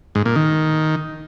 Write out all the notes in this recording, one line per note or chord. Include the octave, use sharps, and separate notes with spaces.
G#2
A#2
D#3